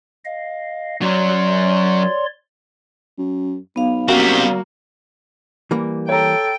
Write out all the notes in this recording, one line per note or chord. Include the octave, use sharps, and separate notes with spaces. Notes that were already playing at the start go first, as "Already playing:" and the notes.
D#5 F5
F#2 F#3 C#5 D5 C6
F#2
B1 B3 F5
F#2 G3 A#3 C4 F#4
E3 G3 A#3
A4 C#5 G5 A#5